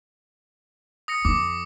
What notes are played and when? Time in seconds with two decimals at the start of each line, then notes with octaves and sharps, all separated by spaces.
1.08 D#6 A#6 C#7
1.25 F2 D6